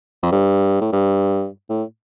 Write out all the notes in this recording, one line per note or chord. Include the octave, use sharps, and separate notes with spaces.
F2
G2
A2
G2
A2